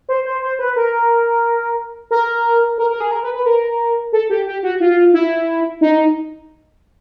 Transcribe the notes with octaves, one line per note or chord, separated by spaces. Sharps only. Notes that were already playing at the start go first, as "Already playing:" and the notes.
C5
C5
C5
B4
A#4
A#4
A#4
A#4
G#4
A#4
B4
B4
A#4
A4
G4
G4
F#4
F4
E4
D#4